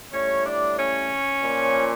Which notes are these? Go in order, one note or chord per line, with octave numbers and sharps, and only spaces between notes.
A2 G3 C#4 C#5
D4 D5
C#4 C#5
A#2 F3